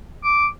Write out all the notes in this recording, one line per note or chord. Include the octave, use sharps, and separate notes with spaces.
D6